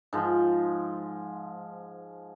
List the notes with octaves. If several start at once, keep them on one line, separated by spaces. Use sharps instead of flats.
G#2 F3